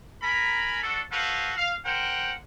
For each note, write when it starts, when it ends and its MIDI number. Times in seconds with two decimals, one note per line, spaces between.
0.21 0.80 70
0.21 0.80 80
0.21 0.80 82
0.21 0.80 83
0.81 1.00 62
0.81 1.00 66
0.81 1.00 69
1.10 1.50 66
1.10 1.50 69
1.10 1.50 71
1.10 1.50 72
1.10 1.50 77
1.55 1.73 77
1.84 2.32 70
1.84 2.32 72
1.84 2.32 78
1.84 2.32 79